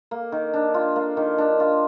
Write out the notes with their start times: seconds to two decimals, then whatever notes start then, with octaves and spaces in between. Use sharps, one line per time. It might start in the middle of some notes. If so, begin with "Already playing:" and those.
0.11 A#3
0.32 D#3
0.54 D4
0.74 F4
0.96 A#3
1.17 D#3
1.38 D4
1.60 F4